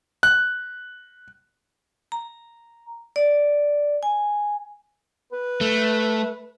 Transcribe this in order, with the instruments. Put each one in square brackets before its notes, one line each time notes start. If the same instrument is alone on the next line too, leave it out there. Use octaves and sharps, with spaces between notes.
[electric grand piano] F#6
[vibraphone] A#5
D5
G#5
[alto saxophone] B4
[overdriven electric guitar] A3